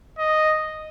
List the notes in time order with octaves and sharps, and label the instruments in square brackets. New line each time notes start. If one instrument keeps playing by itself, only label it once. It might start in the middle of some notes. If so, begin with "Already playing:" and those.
[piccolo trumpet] D#5